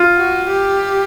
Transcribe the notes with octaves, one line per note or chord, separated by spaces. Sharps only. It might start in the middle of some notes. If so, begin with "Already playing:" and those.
Already playing: F4
F#4
G4